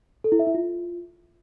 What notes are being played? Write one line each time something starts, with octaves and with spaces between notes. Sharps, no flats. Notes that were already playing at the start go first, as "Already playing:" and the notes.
A4
E4
E5
E4
F4